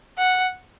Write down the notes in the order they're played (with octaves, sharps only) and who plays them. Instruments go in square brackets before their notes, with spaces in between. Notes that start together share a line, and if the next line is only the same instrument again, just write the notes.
[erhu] F#5